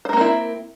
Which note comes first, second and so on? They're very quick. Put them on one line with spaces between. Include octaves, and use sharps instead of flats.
C5 A#4 A#3 C4 E4